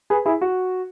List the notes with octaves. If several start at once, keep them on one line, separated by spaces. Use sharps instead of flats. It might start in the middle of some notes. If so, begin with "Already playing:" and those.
G#4 B4
E4 G#4
F#4